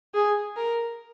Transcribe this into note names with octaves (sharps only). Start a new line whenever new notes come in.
G#4
A#4